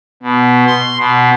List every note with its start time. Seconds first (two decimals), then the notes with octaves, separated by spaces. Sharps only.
0.23 B2
0.67 C6
0.99 B2